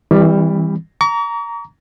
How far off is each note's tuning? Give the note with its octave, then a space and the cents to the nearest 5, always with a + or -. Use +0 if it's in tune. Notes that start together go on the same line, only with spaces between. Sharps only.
E3 -20 G3 +15 C4 -5
A#5 +0 C#6 +45